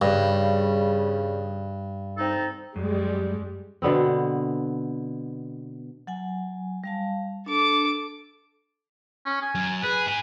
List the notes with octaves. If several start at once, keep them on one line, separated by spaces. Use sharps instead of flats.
G2 C#3 G3
C4 D#4 A4
F#2 G3 G#3
B2 D3 B3 C4
F#3 F#5 G#5
G3 F5 A5
D4 A4 D6
C#4
G#5
F#2
G#4 B4
G#2 G#5